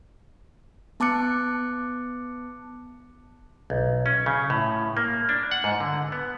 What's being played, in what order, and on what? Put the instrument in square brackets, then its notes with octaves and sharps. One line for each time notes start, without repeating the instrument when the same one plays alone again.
[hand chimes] B3 A5 D6 F#6 C#7
[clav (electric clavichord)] B1
C#4
C#3
A2
A#3
D4
F#5
G#2
D3
B3